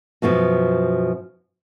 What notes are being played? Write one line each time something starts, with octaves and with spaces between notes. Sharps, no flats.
F#2 B2 F3 B3